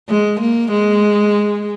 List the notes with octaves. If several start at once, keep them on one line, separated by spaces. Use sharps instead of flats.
G#3
A#3
G#3